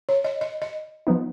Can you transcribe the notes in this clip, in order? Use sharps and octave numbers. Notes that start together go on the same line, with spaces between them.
C#5
D#5
D#5
D#5
F3 B3 D#4